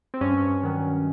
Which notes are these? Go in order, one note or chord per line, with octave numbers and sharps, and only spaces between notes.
C4
G2 C#4
D#3 F#3